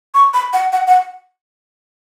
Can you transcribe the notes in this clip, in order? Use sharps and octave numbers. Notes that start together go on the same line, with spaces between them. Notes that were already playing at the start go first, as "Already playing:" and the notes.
C#6
B5
F#5
F#5
F#5